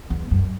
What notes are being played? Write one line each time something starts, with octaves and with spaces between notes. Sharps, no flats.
E2
F#2